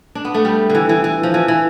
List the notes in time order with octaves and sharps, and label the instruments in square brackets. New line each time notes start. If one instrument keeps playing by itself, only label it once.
[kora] D4
B3
A3
G3
D3
E3
E3
E3
F3
E3
E3